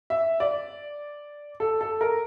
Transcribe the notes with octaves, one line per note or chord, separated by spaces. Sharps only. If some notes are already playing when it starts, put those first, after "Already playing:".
E5
D5
A4
A4
A#4